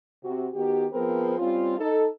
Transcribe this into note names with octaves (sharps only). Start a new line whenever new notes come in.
C3 F#4
D#3 B3 F#4 G4
F3 B3 C4 G#4 A#4 B4
G3 C4 C#4 F4
D#4 A4